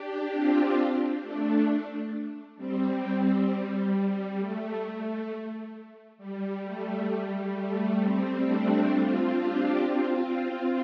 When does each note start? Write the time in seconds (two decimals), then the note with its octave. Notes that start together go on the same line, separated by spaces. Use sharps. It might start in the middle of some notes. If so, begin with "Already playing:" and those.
Already playing: D4 G4
0.31 C4 F4
1.22 A3 D4
2.57 G3 C4
3.03 G3 C4
3.48 G3
3.93 G3
4.38 A3
4.83 A3
6.18 G3
6.64 A3
7.09 G3
7.54 A3
7.99 G3 C4
8.44 A3 D4
8.90 C4 F4
9.35 D4 G4
9.80 C4 F4